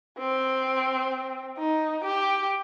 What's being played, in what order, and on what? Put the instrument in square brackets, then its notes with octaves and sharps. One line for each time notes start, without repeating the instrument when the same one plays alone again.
[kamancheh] C4
D#4
G4